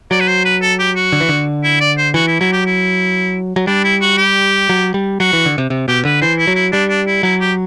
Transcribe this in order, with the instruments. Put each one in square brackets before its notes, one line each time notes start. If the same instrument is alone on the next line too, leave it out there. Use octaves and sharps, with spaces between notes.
[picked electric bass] F#3 [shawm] D5
[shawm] B4
C5
B4
A4
G4
F#4
[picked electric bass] D3
E3
D3
[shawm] E4
D5
C5
[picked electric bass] E3 [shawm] F#4
[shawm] E4
[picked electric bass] F#3 [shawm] E4
[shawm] G4
E4
[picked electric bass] F#3
[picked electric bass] G3 [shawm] D4
[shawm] E4
F#4
G4
[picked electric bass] F#3
G3
[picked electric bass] F#3 [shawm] F#4
[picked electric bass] E3
D3
C3
C3
[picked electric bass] B2 [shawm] G4
[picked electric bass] D3 [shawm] B4
[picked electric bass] E3 [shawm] C5
[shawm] E4
[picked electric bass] F#3
[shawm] E4
[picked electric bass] G3 [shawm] D4
[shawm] D4
E4
[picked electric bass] F#3 [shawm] E4
[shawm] G4